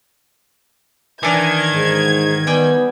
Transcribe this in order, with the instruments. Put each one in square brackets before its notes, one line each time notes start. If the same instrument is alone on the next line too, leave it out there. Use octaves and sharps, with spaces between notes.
[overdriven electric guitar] D#3 [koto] E3 D4 [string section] G#6
[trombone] G#2
[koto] G3 G5 G#5 [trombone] B3